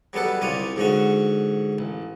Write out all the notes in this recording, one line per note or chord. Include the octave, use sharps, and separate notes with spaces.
F#3 G3 B3 A4 F#5
C2 C#4 F4 D5 D#6
G#2 D3 C#4 F#4
A1